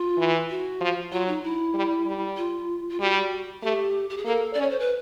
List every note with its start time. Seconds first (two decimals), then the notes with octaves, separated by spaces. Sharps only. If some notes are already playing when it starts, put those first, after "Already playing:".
Already playing: F4
0.18 E3
0.50 F#4
0.80 F3
1.12 F#3 F4
1.27 D#4
1.43 E4
1.74 G3
2.06 G3
2.37 F4
2.89 F4
3.00 G3 F#4
3.62 A3 G4
4.10 G4
4.17 G#4
4.25 A#3 A4
4.53 C#4 D5
4.62 C#5
4.70 C5
4.79 B4